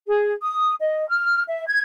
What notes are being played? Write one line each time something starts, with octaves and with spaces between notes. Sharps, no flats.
G#4
D#6
D#5
F6
E5
G#6